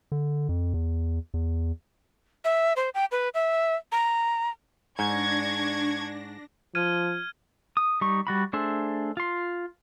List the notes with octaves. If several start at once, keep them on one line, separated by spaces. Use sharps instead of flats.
D3
F2
E2
E2
E5
C5
G5
B4
E5
A#5
G#2 D4 C#6 G#6 A#6
F3 F6 G#6 D#7
D#6
G3 D#4 C#6
G3 F#4 B5
A3 D4 G#4 C5 E5
F4 C6